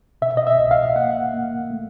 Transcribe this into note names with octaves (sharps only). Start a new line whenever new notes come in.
B2 E5
D#5
E5
C2
F5
A#3 F#5
A#3
A3